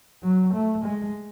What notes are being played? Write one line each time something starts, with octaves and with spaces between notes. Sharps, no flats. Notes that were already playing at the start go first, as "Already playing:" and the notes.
F#3
A3
G#3